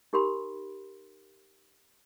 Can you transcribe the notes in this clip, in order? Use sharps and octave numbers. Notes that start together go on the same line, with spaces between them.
D#4 G4 A#4 B5 C6